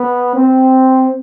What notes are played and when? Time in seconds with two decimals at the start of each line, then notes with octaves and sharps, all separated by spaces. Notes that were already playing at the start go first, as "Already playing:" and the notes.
Already playing: B3
0.35 C4